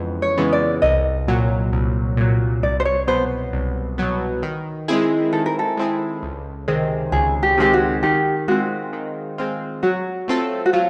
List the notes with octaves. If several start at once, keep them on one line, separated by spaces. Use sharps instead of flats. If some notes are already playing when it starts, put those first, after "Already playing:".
Already playing: F2 C#3 E3 G#3 B3
C#5
C#3 E3 G#3 B3
D5
C2 D#5
A#2 F#3
C2
A#2 F#3
C2 D5
C5
C#5
B2 F#3 B3 C5
C2
B2 F#3 B3
D#3
G#3 C4 E4 G#4
D#3 A4
A#4
A4
G#3 C4 E4 G#4
C#2
C3 D#3 G#3 C4
C#2 G#4
G4
C3 D#3 G#3 C4 G4
F#4
D#3 G4
G#3 C4 F4 F#4
D#3
G#3 C4 F4
F#3 F#4
A3 C4 F4 A4
F#4
F#3 F4